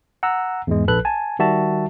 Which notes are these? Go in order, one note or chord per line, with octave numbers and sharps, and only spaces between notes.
F#5 A#5 E6
E2 G#2 G#3
A#1 A4 B4 F#6
G#5 A5
D#3 G3 F#4 E5 A5